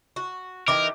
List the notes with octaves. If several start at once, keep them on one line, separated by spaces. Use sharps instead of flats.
F#4
E3 D#4 G4 A#4 D6